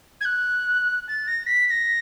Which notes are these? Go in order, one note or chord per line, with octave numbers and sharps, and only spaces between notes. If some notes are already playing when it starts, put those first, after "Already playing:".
G#6
F#6
A6
A#6
B6
B6
A#6